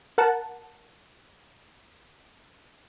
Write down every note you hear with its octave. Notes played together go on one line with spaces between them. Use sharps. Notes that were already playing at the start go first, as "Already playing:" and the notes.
A#4 F#5 A5